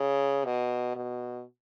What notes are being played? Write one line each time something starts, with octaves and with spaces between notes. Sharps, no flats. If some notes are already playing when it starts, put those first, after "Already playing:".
Already playing: C#3
B2
B2